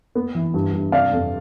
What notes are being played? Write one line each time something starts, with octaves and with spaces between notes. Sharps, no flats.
B3
E3
G2
G2
C3 D5 F5
F2